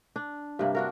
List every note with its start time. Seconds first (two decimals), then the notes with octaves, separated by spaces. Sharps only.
0.16 D4
0.59 G2 C3 A#3
0.75 D4 F#4 A#4